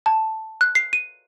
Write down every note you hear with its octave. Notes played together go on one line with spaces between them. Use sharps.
A5
F#6
C7
D#7